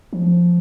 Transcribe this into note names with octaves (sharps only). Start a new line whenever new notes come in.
F3